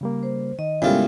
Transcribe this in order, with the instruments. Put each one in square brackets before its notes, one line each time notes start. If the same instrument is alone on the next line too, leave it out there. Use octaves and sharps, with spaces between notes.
[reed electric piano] C#3 G3 A#3
[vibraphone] C5
[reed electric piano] D#3 [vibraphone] D#5
[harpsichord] A2 F4 [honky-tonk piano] C#3 G3 [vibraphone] G#3 B3 A#4